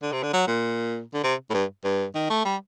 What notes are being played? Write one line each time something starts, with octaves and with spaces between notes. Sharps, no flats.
D3
C3
D3
F#3
A#2
D3
C3
A2
G2
G2
D#3
A3
G3